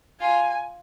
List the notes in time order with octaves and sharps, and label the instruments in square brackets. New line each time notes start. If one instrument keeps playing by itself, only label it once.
[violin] F4 [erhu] G#5